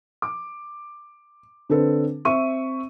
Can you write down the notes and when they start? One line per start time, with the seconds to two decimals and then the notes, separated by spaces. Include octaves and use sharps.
0.22 D6
1.70 D3 C4 D4 A4 B4
2.25 C4 E5 C#6 D#7